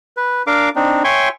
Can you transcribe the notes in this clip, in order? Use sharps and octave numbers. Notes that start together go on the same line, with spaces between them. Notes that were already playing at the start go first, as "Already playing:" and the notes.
B4
D4 A#4 F5 D6
C4 D4 D#4
C#5 E5 G5 G#5 C6 C#6